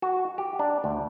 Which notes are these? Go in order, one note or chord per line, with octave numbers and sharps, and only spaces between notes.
F#4
G4
D4
D2